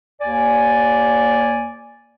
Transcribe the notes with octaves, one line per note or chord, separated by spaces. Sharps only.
D#2 D5 G#5